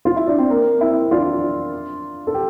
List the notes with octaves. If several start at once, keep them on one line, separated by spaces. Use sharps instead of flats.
F4
E4
D4
C4
A#3
C4 E4
D4 F4
A4
G4